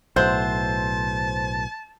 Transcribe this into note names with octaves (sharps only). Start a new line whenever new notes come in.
B1 A2 C5 E5 F#5 A5 C6 G6